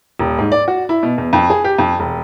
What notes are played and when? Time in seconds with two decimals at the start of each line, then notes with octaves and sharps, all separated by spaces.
0.19 D#1
0.39 G#2
0.52 D5
0.68 F#4
0.89 E4
1.03 B2
1.18 E2
1.33 F2
1.50 G#4
1.64 G4
1.78 F2
1.99 E1